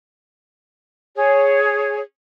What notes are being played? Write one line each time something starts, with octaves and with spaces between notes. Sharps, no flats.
G#4 C#5